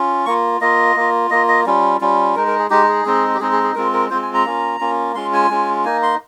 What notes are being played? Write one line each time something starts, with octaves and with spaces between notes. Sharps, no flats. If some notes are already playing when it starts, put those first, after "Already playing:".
Already playing: C#4 F4
A#3 F4 C#6
A#3 F4 D#5
A#3 F4
A#3 F4 D#5
D#5
G3 C#4 F4
G3 C#4 F4
G#3 D#4 A#4
A#4
G#4
G#3 D#4 G4
G#4
G#3 C4 D#4
G4
G#3 C4 D#4 G#4
G#4
G#4
G#3 C4 F4 A#4
A#4
G#3 C4 F4 C5
G#5
A#5
A#3 C#4 F4
A#3 C#4 F4
G#3 C#4 F4 C6
G#5
G#3 C#4 F4
A#3 D#4 G#5
C6